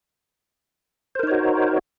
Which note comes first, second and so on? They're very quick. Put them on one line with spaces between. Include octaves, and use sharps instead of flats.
C5 A#4 D#4 C#5 F#4